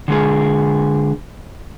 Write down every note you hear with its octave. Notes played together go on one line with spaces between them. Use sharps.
D3 G#3 G#4